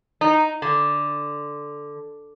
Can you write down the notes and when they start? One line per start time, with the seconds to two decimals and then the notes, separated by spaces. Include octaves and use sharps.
0.21 D#4
0.62 D3